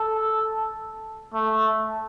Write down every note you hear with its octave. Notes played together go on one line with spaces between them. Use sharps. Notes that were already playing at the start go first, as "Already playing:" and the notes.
Already playing: A4
A3